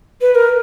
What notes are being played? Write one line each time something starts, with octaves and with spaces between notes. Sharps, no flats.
B4
A#4